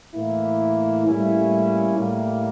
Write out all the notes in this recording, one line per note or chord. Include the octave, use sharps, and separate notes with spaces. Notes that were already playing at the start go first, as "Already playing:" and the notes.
A2 E3 A#3 E4
A2 G3 A#3 C#4 E4
A2 G3 A#3 E4